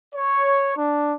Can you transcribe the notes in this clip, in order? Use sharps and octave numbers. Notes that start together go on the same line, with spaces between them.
C#5
D4